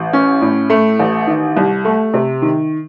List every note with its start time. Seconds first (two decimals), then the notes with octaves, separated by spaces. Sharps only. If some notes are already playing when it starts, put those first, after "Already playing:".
Already playing: A1
0.13 C#4
0.41 A2
0.70 A3
1.00 A1
1.27 D#3
1.57 C2
1.85 A3
2.14 C3
2.42 D#3